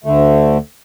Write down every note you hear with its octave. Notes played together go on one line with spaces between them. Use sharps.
D2 D3 A3